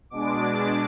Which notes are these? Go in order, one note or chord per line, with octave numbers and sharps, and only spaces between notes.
B2 G#3 D4 D6